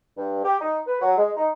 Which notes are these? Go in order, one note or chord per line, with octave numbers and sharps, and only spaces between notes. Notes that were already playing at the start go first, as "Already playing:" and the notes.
G2
G4
D#4
B4
F#3
G#3
D#4